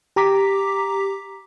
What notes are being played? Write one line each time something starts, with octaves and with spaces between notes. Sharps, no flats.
G4 A#5 D6 B6